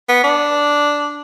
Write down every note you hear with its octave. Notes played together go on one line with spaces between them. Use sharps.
B3
D4